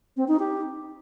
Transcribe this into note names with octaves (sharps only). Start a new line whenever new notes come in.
C4
D#4
G4